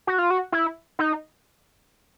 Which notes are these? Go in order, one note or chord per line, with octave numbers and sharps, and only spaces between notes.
F#4
F4
F#4
E4
D#4